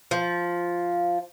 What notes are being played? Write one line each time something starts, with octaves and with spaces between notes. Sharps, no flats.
F3